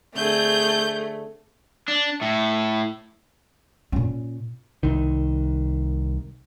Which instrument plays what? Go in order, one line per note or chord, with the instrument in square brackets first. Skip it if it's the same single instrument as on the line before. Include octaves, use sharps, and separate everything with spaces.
[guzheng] D3 [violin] A3 [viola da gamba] C4 G#4 [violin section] G6
[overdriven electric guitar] D4
A2
[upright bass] A#2 C#4
[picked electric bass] C2 D#3